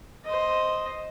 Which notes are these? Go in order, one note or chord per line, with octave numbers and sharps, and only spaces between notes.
C5 D#5